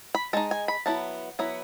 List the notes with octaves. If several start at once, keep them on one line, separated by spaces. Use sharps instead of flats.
B5
G#3 D#4 A5
G#5
B5
F#3 B3 E4 A5
F#3 B3 E4